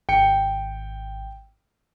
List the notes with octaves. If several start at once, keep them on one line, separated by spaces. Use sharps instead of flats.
G#1 G5 C#7